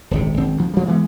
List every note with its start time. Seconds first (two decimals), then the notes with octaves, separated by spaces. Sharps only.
0.11 D#1 G#1 C3
0.37 G#1 C4
0.57 D2 F3
0.74 F3 G3
0.88 E3 G#3 B3